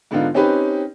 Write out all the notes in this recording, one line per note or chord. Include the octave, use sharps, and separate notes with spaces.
G#2 D3 B3 D4 D#4 F4
C4 C#4 D#4 G4 B4